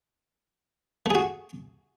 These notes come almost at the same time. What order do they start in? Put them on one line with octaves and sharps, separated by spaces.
A3 G#4 F#4